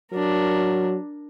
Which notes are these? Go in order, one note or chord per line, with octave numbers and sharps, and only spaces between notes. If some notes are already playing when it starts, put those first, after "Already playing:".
F#3 D4 A#4